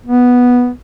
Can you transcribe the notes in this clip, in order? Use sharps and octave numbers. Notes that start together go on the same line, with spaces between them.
B3